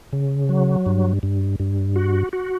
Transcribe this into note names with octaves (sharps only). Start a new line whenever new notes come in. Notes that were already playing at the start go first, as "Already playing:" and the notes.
C#3
F#3
G2
G2
G2
F#4
F#4